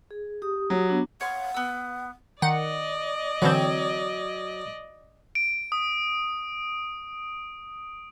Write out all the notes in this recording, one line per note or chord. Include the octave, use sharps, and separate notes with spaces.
G#4
G4 D#6
F#3
B3 D4
C#5 F5 F#5 C6
B3 E6
D#3 D5 D#5 F#5
D3 E3 F#3 C4
D7
D#6